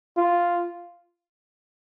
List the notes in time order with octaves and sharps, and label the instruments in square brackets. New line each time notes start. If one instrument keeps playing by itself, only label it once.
[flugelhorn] F4